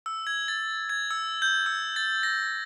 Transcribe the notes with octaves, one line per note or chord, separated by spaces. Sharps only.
E6
G#6
A6
G#6
E6
G6
E6
A6
A#6